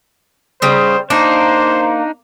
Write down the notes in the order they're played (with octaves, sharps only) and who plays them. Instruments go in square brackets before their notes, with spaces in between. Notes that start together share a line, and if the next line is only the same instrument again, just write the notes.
[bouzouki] C#3 G3 [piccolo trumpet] C5
[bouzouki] A#3 [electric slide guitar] D4 D#4 [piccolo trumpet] C5